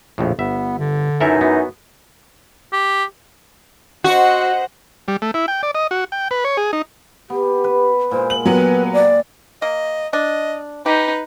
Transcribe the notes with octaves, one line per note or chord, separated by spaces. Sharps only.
A#1 F2 A2
G1 B3 E5
D3
F#2 E3 D#4 A4 A#4 E5
B3 F#4
G4
F#4 C5 D#5 F#5
G3
A3
E4
G5
D5
D#5
F#4
G5
B4
C#5
G#4
D#4
B3 G4
B4
A#2 G#3 C5
F#7
F#3 B3 G4 B4 G#5
D5
A#3 D#5
D4 D#5
D#4 G4 B4